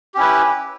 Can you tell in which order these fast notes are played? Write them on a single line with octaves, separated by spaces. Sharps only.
G4 C#4 E4 B4